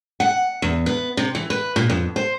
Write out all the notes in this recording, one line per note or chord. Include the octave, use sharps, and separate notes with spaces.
F#5
E2
B3
C3
E3
B4
A#2
F2
C5